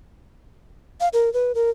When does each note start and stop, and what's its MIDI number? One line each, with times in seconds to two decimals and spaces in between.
1.01 1.08 77
1.13 1.32 70
1.34 1.52 71
1.55 1.70 70